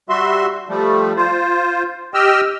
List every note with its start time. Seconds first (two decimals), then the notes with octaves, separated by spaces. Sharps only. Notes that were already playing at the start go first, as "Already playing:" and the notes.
0.09 G3 F#4 E5 C6
0.69 F3 G3 A3
1.16 F4 C5
2.14 G4 D#5 G5 E6 F6